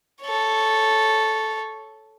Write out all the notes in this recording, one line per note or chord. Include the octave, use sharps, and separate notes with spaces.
A4 C#5